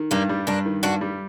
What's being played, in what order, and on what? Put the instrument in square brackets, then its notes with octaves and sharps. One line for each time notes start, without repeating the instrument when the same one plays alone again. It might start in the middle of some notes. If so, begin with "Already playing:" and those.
Already playing: [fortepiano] D#3
[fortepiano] G2 [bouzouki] G3 A#3
[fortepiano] G3
[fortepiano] G2 [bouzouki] A#3 D4
[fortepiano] D#3
[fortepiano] G2 [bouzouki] D4 F#4
[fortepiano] G3